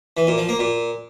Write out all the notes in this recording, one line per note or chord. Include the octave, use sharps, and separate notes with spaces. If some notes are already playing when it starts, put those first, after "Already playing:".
E3
A#2
F3
A#3
A#2